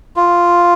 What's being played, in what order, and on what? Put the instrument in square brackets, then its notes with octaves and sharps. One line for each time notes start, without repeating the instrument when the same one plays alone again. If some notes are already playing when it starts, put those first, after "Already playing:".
[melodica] F4